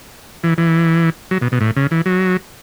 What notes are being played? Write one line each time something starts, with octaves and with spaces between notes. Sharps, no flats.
E3
E3
F#3
B2
B2
A2
C#3
E3
F#3